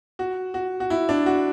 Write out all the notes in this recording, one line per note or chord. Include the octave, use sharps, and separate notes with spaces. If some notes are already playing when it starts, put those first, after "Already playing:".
F#4
F#4
F#4
E4
D4
F#4